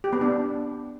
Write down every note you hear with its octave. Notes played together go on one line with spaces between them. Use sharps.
G4
B3
D4